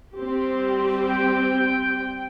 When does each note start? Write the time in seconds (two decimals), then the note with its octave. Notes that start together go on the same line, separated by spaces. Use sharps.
0.16 G3 C4 G4
1.07 G5